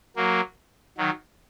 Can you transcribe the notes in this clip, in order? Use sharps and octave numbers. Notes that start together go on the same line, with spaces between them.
F#3 A#3
D#3 F#3